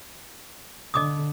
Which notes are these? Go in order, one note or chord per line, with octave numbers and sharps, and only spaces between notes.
D3 D#5 D6 D#6